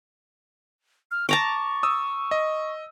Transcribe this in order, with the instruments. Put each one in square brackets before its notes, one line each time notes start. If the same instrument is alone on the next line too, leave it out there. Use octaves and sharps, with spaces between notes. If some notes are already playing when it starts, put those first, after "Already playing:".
[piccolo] F6
[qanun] A5 A#5 D6 [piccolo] C#6
[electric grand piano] D#6 E6
D#5